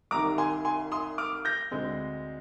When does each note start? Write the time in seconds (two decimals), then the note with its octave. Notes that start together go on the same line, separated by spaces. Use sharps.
0.11 C2 C3 D#3 A#5 D6
0.38 G#5 C6
0.65 G#5 C6
0.92 C6 D#6
1.18 D6 F6
1.45 G6 A#6
1.71 D2 D3 G#3 C4